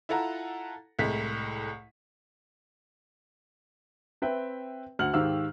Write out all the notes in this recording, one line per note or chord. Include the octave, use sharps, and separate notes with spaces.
E4 F4 A4 F#5 A#5
C2 A2 G#3 B6
C4 B4 E5 G5
D2 F#5 F6 F#7
G#2 D#3 G4 F5 E6 F6